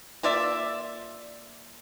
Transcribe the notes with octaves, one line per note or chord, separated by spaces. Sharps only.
A#3 F4 D5 E5